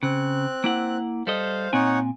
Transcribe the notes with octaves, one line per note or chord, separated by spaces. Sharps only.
C#3 C4 F#6
A#3 E4 F#5
G3 A4 C5 D#5 F5
A#2 C4 D#4 C#5 F#5 G#5